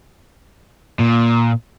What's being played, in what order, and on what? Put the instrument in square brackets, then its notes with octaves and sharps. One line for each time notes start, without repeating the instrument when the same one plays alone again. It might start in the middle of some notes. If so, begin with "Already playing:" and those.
[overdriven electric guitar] A#2